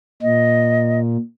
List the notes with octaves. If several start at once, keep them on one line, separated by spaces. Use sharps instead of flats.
A#2 D#5